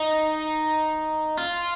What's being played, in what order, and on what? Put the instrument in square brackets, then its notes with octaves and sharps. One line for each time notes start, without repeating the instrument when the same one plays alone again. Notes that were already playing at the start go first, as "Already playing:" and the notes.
Already playing: [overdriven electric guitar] D#4
F4